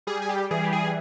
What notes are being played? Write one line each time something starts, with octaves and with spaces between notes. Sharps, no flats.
G3 G#4
G#4
G4
E3 G#4
G4
G#4